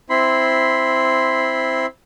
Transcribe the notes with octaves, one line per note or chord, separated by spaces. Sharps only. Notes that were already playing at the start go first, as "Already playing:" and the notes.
C4 E4 B5 C6